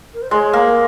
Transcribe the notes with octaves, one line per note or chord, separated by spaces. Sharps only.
A#4
C5
G#3 C#5 D#5
A#3
A#4